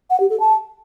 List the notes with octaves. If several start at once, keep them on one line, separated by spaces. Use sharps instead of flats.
F#5
G4
A4
A5